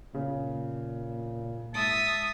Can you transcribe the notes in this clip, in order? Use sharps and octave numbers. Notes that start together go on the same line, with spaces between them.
A#2 C#3
G#2 E5 A5 D#6